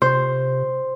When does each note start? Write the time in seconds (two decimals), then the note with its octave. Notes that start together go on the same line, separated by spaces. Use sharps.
0.02 C3 C5